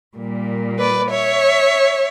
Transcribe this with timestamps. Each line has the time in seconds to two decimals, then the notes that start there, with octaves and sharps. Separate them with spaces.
0.15 A#2 G3 A#3
0.78 B4 D5
1.11 C#5 E5